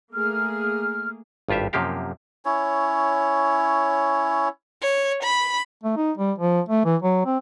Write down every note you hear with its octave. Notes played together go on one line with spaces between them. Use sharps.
A3 A#3 G#4 F6
G#1 G2 F4 G4 E5
F#2 C3 F3 A#3 G4 F5
C#4 E4 C#5
C#5
B5
A3
D#4
G3
F3
A3
E3
F#3
C4